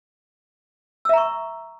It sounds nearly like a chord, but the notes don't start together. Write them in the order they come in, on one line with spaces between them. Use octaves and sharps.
E6 E5 A#5 C#6